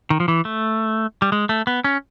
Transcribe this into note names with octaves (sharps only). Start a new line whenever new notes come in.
D#3
F3
E3
A3
G3
G#3
A3
B3
C#4